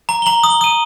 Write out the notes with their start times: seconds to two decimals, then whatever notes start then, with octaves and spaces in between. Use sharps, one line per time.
0.09 A#5
0.22 G7
0.26 A#5 F#7
0.44 D#6
0.50 G7
0.61 D#6 D#7